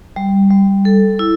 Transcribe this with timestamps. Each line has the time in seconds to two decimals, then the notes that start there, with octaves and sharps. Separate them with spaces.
0.16 G3
0.51 G3
0.85 A4
1.19 E4